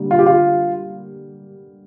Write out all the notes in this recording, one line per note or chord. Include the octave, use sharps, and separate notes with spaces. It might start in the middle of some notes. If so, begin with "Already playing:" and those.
Already playing: D3 G3 A#3
F4
G4
F4